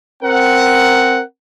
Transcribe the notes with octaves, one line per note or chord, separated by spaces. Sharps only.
C4 A#4 F#5